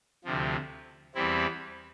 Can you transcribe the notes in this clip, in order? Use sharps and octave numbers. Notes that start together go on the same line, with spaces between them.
D2 C3 F3
E2 E3 G3 C4 E4